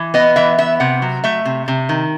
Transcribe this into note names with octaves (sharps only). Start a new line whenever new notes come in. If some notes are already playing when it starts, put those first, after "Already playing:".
Already playing: E3
B3 D#5
E3 E5
B3 E5
C3 F#5
F#3
A3 E5
C3
C3
D#3